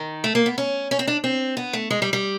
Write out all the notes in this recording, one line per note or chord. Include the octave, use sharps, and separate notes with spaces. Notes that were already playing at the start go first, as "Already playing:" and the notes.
Already playing: D#3
A3
A#3
B3
C#4
C#4
C4
D4
C4
B3
A3
G#3
G3
G3